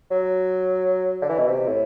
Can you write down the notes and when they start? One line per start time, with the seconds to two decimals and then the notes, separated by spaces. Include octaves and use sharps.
0.11 F#3
1.22 D3
1.29 E3
1.38 B2
1.48 C3
1.67 A2